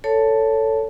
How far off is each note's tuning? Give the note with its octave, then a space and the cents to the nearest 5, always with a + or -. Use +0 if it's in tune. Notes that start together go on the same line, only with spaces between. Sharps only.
A4 +10 C#5 +15 A5 +0